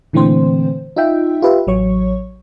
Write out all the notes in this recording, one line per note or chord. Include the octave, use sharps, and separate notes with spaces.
A#2 D3 E3 A3 C4 C5
D#4 F4 E5 G5
F4 G4 B4 E5
A1 F#3 C#5 C#6